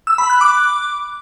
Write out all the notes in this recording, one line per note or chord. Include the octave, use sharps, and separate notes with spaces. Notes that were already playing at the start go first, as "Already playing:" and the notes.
E6
B5
F#6
D6